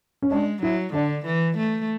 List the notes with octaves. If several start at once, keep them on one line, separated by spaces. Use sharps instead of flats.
C#4
G#3 D4
F#3 E4
D3 D4
E3
A3